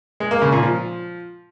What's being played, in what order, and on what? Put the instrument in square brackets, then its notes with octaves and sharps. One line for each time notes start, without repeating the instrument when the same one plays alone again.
[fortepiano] G#3
A#3
C#3
A#2
F3